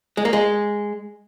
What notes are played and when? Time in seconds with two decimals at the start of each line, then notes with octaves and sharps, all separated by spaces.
0.17 G#3
0.25 A#3
0.33 G#3